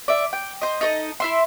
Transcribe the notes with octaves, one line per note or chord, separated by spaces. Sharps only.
D5 E5
G5
C5 D#5
D#4 A4 D5 D#5
E4 E5 C6